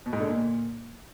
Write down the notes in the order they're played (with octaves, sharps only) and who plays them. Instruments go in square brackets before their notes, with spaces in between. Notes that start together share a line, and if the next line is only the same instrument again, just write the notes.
[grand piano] B2
G#2
D3
A#2